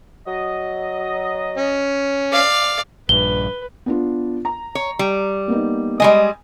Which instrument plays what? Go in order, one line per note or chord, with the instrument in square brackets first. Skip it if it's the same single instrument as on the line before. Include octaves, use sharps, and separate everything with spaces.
[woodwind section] F#3 D#5
[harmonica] C#4
[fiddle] D5 F5
[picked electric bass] A#1 G2 [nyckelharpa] B4 [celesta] G7
[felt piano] B3 D4 F4
A#5
[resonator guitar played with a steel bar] C#5
G3
[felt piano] A#3 B3 D#4
[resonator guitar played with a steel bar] G3 G#3 D#5 [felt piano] G#5 B5